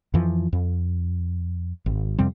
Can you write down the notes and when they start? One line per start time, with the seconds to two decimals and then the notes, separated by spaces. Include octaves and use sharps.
0.14 F2 E3 F3
0.53 F2
1.86 G#1
2.18 F2 C3 G3 C4